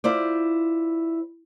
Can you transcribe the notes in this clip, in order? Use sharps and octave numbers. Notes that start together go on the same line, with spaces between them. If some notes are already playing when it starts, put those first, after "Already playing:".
E4 F4 C5 D5